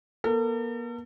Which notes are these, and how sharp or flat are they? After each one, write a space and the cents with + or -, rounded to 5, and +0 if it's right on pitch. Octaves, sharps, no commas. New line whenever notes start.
A#3 +45 A4 +45